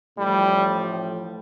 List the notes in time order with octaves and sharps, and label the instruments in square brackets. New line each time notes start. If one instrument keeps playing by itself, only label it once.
[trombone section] A1 A2 F3 G3